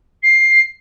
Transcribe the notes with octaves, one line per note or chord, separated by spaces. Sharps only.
C7